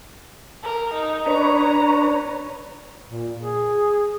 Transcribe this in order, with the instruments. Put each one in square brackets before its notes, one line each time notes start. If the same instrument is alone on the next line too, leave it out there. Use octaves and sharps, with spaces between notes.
[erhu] A#4
D#4
[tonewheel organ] D4 B4 C#5 [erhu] A#5
[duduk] A#2
G#4